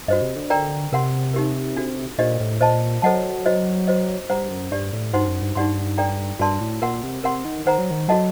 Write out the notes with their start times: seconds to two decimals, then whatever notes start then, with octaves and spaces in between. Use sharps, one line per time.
0.08 G2 F#4 C5 D#5
0.22 C3
0.36 D3
0.50 A#4 D5 G5 A#5
0.92 C3 A#4 F#5 C6
1.34 D#4 G4 A#4
1.76 D4 F#4 A4
2.18 A#2 D4 G4 C5 D#5
2.40 A2
2.60 A#2 C5 D#5 A5
3.02 F#3 A4 C5 D#5 F#5 A5
3.46 F#4 C5 D#5
3.88 F#4 C5 D#5
4.29 G2 C5 F#5 A#5
4.50 F#2
4.71 G2 D4 G4 D5
4.93 A2
5.13 G2 D#4 F#4 C5 F#5 C6
5.27 F#2
5.42 G2
5.55 G2 D#4 G4 D5 F#5 C6
5.97 D4 A4 D5 G5 A#5
6.39 G2 F#4 A#4 D5 A5 C6
6.61 A2
6.82 A#2 A#4 F#5 C6
7.03 C3
7.24 C3 A#4 F#5 C6
7.45 D#3
7.66 D#3 C5 F#5 A#5
7.78 F#3
7.91 D#3
8.08 F#3 F#4 A4 D#5 F#5 A5